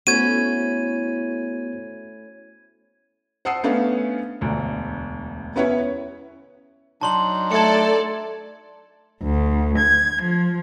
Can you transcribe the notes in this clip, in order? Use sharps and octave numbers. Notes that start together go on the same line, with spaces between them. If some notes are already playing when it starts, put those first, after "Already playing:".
A3 B3 C#4 E4 F#4 C5 G#6 D#7
C5 F#5 A5 D#6 E6 C7
A3 B3 C#4 D4 F5
E1 D2
B3 C#4 E4 B4 C#5
F#3 D4 D#4 A5 C6 F#7
A3 A4 D5 G#6 C#7
D2
G#6
F3